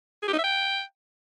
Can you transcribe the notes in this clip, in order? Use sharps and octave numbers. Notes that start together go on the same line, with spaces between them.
G#4
G4
D#4
E5
G5